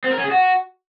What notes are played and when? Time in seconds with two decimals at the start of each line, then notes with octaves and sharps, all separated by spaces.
0.04 C4
0.11 A#4
0.17 C#4
0.24 G#4
0.31 F#4